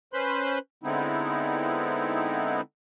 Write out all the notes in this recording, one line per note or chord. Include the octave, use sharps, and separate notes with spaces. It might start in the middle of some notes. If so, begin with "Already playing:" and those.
C#4 B4 C5 B5 C6
D3 G#3 B3 C4 D#4 E4